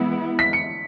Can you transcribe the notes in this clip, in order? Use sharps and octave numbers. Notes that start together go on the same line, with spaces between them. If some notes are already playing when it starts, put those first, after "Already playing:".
Already playing: E3 G#3 B3 E4
B6
C#7